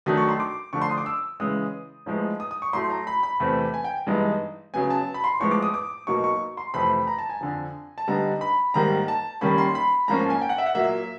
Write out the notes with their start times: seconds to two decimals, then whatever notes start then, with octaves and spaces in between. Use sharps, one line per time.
0.06 D#3 F#3 A3 D4 D#6
0.17 C#6
0.29 C6
0.40 D6
0.73 D3 F3 A3 D4 C#6
0.82 C6
0.90 D#6
0.98 D6
1.06 E6
1.40 C#3 E3 G#3 D#6
2.06 A2 F3 G#3 B3 D#4
2.40 D#6
2.51 D#6
2.62 C#6
2.73 A2 F#3 A3 C6
2.90 A#5
3.07 B5
3.23 B5
3.40 E2 C3 E3 A3 C4
3.74 G#5
3.84 G5
4.07 G2 E3 G#3 B3 D#4
4.74 C#3 F#3 B3 G#5
4.90 A5
5.14 B5
5.24 C6
5.40 A2 F3 G#3 B3 C#6
5.51 D6
5.62 D#6
5.74 D6
6.07 B2 F#3 A#3 D#4 C#6
6.24 C#6
6.57 C6
6.74 F2 C3 E3 A3 C4 B5
7.07 A#5
7.19 A5
7.30 G#5
7.41 F2 D3 F3
7.98 A5
8.08 D3 G3 B3 D#4 A#5
8.41 B5
8.74 G#2 D#3 G3 A#3 A#5
9.08 A5
9.41 D#3 G3 A#3 C#4 B5
9.58 C6
9.75 B5
10.08 G#2 F3 A#3 C#4 A#5
10.19 A5
10.30 G#5
10.41 G5
10.49 F#5
10.58 E5
10.66 F#5
10.75 A#2 F#3 A#3 E5